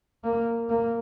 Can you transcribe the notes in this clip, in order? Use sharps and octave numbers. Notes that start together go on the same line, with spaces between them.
A#3
A#3